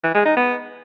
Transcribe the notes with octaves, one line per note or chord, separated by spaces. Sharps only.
E3
G#3
D#4
B3